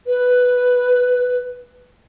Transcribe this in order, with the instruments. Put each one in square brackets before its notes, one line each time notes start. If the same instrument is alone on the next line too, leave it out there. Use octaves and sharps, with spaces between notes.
[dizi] B4